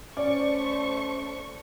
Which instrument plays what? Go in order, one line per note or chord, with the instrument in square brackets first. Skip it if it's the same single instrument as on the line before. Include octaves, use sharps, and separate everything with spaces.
[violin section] A3 C5 C#6 [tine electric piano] C#4 [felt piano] D5